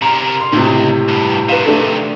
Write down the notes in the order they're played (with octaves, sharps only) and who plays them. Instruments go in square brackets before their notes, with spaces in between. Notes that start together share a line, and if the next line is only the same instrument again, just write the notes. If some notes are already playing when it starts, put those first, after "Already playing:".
[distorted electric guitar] C3 A#4 [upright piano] A#5
[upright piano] C6
[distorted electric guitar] C#2 [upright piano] A2 C3
[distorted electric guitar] G2 B2
[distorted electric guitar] C3 D#3 [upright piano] B4 F5
[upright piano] A3 D4 A4